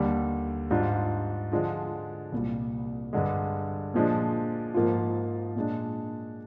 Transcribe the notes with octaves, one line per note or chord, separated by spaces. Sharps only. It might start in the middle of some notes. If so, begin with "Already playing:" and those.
Already playing: D#2 D3 G3
G#2 G3 D4 F4
D3 F3 G#3 D4 F4
C2 A#2 G3
G2 D3 G#3
A#2 F3 G#3 D4
G#2 F3 A#3 F4
A#2 G#3 D4